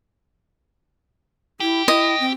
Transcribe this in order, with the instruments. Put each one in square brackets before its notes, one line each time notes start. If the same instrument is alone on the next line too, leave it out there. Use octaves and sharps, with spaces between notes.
[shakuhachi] E4 [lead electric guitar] G4
[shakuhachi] E4 [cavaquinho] D#5
[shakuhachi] C4